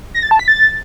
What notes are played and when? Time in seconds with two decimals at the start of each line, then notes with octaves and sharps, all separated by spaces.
0.14 A#6
0.23 A6
0.31 A5
0.39 B6
0.48 A6